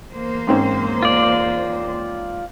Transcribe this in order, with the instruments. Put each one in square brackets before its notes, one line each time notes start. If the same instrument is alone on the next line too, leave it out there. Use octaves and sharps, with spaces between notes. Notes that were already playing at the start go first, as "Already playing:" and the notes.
[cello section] E2 A#3 C5
[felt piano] G#2 C4 C#4
[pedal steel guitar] F4 D5